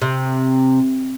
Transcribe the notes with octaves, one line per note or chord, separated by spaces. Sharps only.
C3